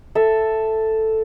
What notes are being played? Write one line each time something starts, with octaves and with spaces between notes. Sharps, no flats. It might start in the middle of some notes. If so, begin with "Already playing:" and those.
A4 E5